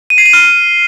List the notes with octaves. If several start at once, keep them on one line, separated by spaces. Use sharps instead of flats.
D#7
C7
D#7
F6